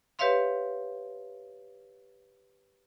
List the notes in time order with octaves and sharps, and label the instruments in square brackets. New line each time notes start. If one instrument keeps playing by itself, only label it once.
[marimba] G4 B4 C#5 E5 F5 C6